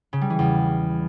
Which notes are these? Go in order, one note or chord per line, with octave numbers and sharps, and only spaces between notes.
C#3
G3
E3
E2